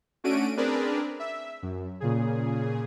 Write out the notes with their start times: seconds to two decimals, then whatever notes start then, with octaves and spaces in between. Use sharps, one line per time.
0.24 A3 C#4 D4 F#4 D7 D#7
0.57 C4 D4 G#4 A#4 B4 D5
1.20 E5
1.62 F#2
2.00 A#2 C#3 G#4